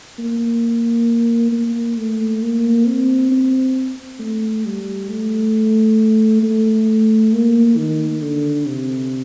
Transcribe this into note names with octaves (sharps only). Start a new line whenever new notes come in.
A#3
A#3
A3
A#3
C4
C4
A3
G3
A3
A3
A#3
D#3
D3
C3